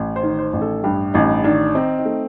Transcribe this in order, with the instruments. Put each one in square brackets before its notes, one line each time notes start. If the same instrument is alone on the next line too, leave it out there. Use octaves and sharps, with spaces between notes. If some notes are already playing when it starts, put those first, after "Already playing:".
Already playing: [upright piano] A1
C5
D#3
C5
A1
A4
G2 G4
A1 D#4
D#3 D4
C4 D#4
D#4
A3